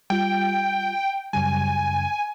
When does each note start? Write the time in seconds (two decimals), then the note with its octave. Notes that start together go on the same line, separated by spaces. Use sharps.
0.10 G3 F4 G5
1.33 F#2 C#3 G3 G#5